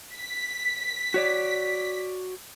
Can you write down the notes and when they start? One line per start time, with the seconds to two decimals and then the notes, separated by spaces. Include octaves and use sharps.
0.15 B6
1.14 F#4 C#5 D5